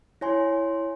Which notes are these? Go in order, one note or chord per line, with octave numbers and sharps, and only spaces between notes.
E4 C#5 G#5 C6